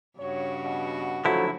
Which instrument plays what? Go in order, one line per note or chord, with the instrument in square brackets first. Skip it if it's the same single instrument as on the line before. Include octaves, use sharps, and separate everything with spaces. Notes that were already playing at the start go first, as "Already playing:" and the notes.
[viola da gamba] G2 C#3 F#4 [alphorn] C#5
[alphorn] B2
[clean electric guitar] D3 E4 [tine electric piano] F3 F#3 A3